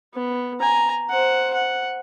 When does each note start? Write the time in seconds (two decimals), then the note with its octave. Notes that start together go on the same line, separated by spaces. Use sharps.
0.14 B3
0.60 G#5 A#5
1.10 C5 F#5
1.54 F#5